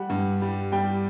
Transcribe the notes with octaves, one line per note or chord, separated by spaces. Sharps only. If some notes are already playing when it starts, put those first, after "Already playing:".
Already playing: G3 F#5
G2
G3
G3 G5